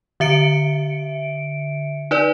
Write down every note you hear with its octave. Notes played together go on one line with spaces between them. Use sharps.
D3 E5 C#7 D7
D#4 B4 D5